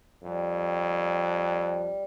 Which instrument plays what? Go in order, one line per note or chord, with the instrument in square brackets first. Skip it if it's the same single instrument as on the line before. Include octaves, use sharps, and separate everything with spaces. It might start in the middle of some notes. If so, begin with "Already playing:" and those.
[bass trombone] F2 [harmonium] G3